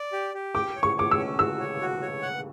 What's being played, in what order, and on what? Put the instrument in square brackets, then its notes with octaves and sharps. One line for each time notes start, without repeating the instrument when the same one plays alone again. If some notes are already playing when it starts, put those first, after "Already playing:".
Already playing: [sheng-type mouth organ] D5
G4
G4
[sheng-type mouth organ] G5 [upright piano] D6
[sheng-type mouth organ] C#5
[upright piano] C#6
[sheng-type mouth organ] C#5 [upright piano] D6
[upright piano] E6
[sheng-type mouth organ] C#4
[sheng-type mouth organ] F#4 [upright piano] E6
[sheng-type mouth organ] C#5
F#4
C#5
F#5